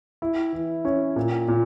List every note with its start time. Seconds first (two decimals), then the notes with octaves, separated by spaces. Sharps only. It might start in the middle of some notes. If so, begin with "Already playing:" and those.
0.22 E4
0.53 E3
0.85 C#4
1.16 A#2
1.48 A#2